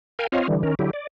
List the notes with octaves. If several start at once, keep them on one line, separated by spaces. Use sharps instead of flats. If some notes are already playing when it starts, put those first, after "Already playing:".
A#4 F5 G5 G#5
C4 F4 C#5 D#5 F5
D3 E3 G3
D#3 C#4 A#4
D3 F#3 E4 G4
D5